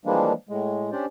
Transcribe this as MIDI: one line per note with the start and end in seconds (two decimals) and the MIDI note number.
0.06 0.33 52
0.06 0.33 53
0.06 0.33 55
0.06 0.33 56
0.06 0.33 58
0.06 0.33 62
0.49 0.90 45
0.49 0.90 56
0.92 1.06 61
0.92 1.06 62
0.92 1.06 67
0.92 1.06 72
0.92 1.06 74